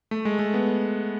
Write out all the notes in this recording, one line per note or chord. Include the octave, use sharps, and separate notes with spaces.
A3
G#3
A3
B3